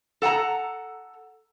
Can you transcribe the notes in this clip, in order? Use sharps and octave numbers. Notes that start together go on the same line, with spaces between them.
A4 F#5 G#5 A#5